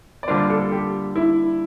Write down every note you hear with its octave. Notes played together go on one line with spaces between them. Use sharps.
D5
D3 G3 A#3 D4 F4 C5
A4
G4
E4